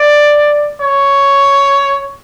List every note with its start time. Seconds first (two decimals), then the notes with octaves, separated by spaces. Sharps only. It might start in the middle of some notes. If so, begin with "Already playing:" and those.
Already playing: D5
0.81 C#5